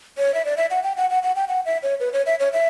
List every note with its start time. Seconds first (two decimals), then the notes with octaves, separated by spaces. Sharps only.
0.18 C#5
0.34 E5
0.45 D5
0.57 E5
0.71 F#5
0.83 G5
0.97 F#5
1.10 F#5
1.23 F#5
1.36 G5
1.48 F#5
1.66 E5
1.83 C#5
2.00 B4
2.13 C#5
2.26 E5
2.40 C#5
2.53 E5